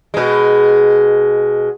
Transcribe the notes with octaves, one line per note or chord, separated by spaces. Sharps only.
B2 G#3